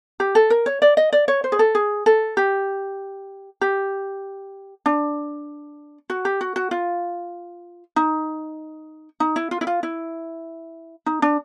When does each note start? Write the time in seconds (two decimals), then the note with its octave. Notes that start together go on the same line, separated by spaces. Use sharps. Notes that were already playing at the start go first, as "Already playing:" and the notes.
0.20 G4
0.35 A4
0.50 A#4
0.66 C#5
0.82 D5
0.97 D#5
1.13 D5
1.28 C#5
1.44 C5
1.52 G#4
1.59 A4
1.75 G#4
2.06 A4
2.37 G4
3.61 G4
4.86 D4
6.10 F#4
6.25 G4
6.41 F#4
6.56 F#4
6.71 F4
7.96 D#4
9.20 D#4
9.36 E4
9.51 F4
9.61 E4
9.67 F4
9.83 E4
11.06 D#4
11.22 D4